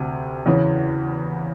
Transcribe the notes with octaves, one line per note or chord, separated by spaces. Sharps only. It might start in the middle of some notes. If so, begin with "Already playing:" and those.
Already playing: D2 C3
E2 C#3 E3